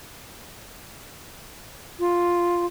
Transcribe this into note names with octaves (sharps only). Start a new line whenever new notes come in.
F4